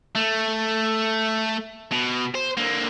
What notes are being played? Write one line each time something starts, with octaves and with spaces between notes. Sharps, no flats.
A3
B2
C5
D3 A#3